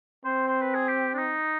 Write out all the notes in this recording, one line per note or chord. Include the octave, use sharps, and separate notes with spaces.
C4 C5
C5
B4
G#4
G4
D4
D#4